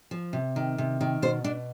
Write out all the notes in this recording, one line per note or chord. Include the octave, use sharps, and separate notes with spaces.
F3
C3
D#3
C3
D#3
B2 C5
B2 D4